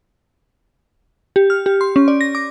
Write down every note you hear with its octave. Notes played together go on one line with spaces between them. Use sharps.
G4
F6
G4
C6
C#4
D5
A#6
D6